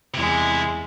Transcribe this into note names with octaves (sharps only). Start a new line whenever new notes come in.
E2 C3 G#3 E4